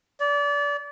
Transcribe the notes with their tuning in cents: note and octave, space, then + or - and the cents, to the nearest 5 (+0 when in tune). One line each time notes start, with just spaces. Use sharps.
D5 -30